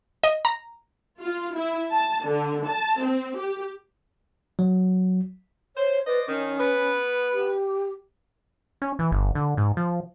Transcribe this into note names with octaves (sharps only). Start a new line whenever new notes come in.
D#5
A#5
F4
E4
A5
D3
A5
C4
G4
F#3
C5 C#5
B4 C5 D5 D#5
D#3 C#4
B3 B4
G4
C#4
E3
G1
D3
G#2
F3